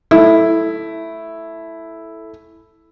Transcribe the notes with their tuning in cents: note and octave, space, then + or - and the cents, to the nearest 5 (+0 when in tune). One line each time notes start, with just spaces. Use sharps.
A3 +0 E4 +0